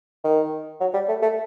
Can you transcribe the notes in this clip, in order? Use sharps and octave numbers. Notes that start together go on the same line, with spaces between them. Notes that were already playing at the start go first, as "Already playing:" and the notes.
D#3
F#3
G3
A3
A3